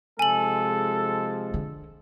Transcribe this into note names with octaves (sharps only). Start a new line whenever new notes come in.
C3 F3 G#3 A4 G#5 F#7
D3